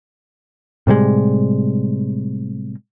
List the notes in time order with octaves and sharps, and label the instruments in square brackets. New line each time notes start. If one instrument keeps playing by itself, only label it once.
[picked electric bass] A2 C3 G3 G#3